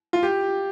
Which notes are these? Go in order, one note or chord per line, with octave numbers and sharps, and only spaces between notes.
F4
G4